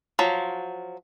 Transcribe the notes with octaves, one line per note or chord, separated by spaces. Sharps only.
F3 F#3